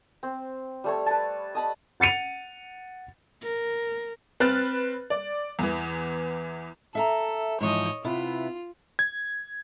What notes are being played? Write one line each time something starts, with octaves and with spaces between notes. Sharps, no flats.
C4
G3 A3 C#5
B4 A5
D#5 A5 B5
F#5 A6 C#7 D#7 F7
A#4
C4 B4 F6 F#6 A6
D5
E2 E3
A4 E5 F5 A#5
G#2 E3 F3 C#5 D#5
C3 B3 E4 F4
G#6